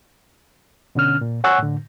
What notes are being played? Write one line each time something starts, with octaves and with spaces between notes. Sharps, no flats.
B2 D3 C#4 F6
A#2
C#5 F#5 G#5 C#6 E6 F#6
A2 D3